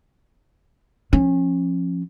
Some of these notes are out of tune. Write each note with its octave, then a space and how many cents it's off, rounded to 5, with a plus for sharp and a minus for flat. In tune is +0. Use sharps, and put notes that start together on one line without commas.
F3 +0 C#4 -30